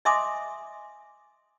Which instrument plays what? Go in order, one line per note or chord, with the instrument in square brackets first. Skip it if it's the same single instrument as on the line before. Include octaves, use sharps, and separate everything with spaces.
[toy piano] D#5 E5 G#5 C6 D6 D#6